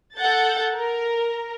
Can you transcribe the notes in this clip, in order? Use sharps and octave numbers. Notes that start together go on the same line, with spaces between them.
A4 F#5 G6 A6
A#4